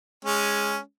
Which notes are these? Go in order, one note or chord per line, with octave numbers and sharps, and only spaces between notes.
G#3 C#4